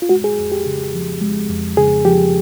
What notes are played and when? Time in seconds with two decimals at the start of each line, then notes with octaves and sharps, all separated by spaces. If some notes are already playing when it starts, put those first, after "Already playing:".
0.02 F4
0.09 G#3 F#4
0.24 G#4
0.38 F2
0.52 G4
0.66 C#3
0.94 F3
1.21 G#3
1.50 F2
1.77 C#3 G#4
2.05 F3 G4